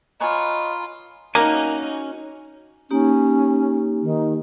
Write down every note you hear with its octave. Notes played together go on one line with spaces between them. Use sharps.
F4 B4 C#5 D#5 G#5 A#5 B5 F6
A#3 C#4 D#4 F#4 G#5
A#3 C#4 D#4 G4
D#3